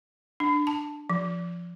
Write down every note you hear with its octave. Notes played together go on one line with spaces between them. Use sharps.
D4
A5
F3